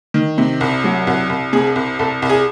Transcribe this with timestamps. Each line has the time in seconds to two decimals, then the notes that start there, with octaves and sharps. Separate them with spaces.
0.14 D#3
0.38 C3
0.61 C2
0.84 F#3
1.07 C2 F#4
1.29 C2
1.53 C3 G#4
1.76 C2
1.99 C2 A4
2.22 C2
2.29 G#4